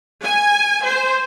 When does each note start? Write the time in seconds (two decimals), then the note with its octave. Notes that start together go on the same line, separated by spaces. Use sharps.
0.24 G#5
0.84 C5